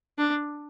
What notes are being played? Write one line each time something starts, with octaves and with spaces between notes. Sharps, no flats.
D4